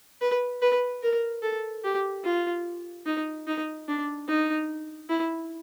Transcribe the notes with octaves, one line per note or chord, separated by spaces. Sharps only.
B4
B4
A#4
A4
G4
F4
D#4
D#4
D4
D#4
E4